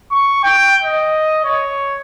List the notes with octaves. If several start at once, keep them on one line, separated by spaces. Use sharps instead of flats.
C#6
G5
D#5
C#5